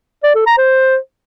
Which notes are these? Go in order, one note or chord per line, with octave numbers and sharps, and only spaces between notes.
D5
A4
A#5
C5